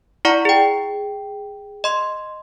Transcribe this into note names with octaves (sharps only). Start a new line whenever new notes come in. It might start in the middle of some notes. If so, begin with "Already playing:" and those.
E4 D5 F#5 A#5 C#6
G#4 G5
D#5 C6